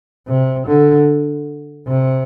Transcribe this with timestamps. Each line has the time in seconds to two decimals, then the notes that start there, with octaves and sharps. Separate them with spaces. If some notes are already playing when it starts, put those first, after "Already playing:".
0.28 C3
0.67 D3
1.88 C3